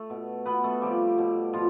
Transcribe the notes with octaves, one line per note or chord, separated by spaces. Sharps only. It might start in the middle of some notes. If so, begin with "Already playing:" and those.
Already playing: A3 A4
B2
B2 B3 B4
A3 A4
C3 F3 G3 G4
B2
B2 F3 F4